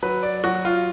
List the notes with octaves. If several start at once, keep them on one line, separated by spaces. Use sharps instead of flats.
F#3 B4
D5
F#3 F#4
F4